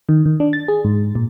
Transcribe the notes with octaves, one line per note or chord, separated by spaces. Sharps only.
D#3
D#3
D4
A6
G#4
G#2
A#2